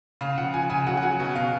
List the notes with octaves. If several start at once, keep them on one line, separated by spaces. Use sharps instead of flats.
C#3 F5
F3 F#5
F3 G#5
C#3 G#5
F#3 F#5
F#5
F#3 G#5
B2
B2 F5